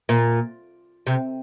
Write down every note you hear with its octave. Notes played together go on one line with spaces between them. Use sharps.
A#2
C3